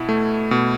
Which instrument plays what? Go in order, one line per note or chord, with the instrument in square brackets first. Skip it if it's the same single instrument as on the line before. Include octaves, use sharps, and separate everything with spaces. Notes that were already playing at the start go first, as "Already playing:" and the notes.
Already playing: [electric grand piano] B2 E4
A3
B2